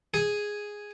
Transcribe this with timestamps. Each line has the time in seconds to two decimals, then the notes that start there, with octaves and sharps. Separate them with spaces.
0.14 G#4